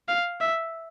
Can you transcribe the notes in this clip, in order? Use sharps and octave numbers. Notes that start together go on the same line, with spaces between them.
F5
E5